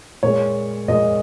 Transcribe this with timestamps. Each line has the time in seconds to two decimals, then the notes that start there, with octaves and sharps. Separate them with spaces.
0.23 A#2 G#3 C#5
0.88 A#2 G#3 D#5